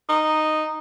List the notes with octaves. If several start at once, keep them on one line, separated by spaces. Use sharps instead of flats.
D#4